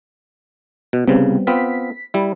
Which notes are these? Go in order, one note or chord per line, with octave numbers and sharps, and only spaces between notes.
B2
C2 C#3 G3 B3 C4
B3 C4 F4 B6
G3 E4